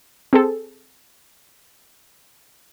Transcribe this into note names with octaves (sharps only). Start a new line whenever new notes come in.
C4 G#4 A4